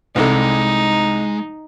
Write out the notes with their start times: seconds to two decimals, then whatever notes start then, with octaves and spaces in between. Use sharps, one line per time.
0.16 C2 C3 G#3 D#4 A4